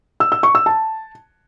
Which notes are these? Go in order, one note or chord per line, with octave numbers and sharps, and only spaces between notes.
E6
E6
C#6
E6
A5